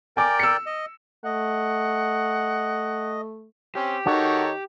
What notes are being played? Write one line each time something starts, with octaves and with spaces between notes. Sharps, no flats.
A#4 D5 G5 G#5 D6
E6 C#7
D#5
A3 D#5 F#5
C4 C#4 G4
D#3 D#4 F#4 A4 C#5